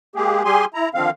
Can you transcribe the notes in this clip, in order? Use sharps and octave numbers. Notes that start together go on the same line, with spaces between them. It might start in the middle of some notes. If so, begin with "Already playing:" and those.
G#3 A#3 G4 G#4
G3 G4 G#4 G#5 C6
E4 A#5
D3 D#3 F3 C4 F5